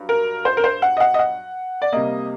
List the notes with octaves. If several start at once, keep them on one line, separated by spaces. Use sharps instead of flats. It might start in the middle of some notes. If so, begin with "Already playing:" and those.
Already playing: G2 F#3
A#4
C5
A#4
C5
F#5
D#5
F#5
D#5
F#5
D5
C3 G3 A#3 D#5